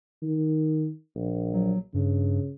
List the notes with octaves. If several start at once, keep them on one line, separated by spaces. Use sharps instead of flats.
D#3
A#1
F#3
G2 C#3